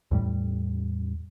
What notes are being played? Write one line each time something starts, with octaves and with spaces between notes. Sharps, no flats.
E2 A2 G3